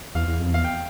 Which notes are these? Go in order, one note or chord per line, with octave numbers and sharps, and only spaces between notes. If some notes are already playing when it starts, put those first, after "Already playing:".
E2 F5
E2
F2
E2 F5
G5